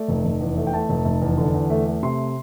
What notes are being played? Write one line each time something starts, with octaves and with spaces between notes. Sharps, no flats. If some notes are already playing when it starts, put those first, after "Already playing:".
Already playing: A3 D5
F1
F1
E2
A3
G5
A3 A5
F1
F1
E2
D3
E2
A3
A3
C3 C6